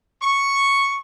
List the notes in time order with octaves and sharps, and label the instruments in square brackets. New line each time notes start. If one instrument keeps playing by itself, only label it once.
[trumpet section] C#6